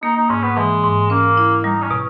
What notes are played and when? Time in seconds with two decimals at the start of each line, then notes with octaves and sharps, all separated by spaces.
0.03 A#3 D#4
0.17 D#4
0.30 G#2 C#4
0.43 B3
0.57 E3 G#3
0.84 G#2
1.10 A#3 C#4
1.37 E4
1.64 G3 D#4
1.82 C#4
1.91 B2